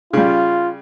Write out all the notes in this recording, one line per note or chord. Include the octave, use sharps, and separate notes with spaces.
C#3 G3 F4